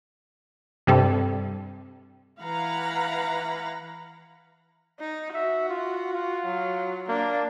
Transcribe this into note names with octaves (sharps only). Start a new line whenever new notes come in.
G2 C3 G3 G4 A4
E3 F5 F#5 A#5 B5
D#4
F#4 E5
F4
F4
F#3
A#3 D4